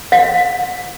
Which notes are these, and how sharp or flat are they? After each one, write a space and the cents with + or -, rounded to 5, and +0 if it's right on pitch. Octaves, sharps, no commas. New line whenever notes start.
F5 +35